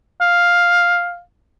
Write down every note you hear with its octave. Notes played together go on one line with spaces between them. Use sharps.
F5